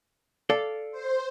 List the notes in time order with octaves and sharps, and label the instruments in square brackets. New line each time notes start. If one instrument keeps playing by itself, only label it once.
[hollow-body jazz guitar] A4 D5 F5
[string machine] C5